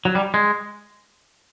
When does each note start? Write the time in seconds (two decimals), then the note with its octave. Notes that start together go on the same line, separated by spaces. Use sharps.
0.05 F#3
0.15 G3
0.34 G#3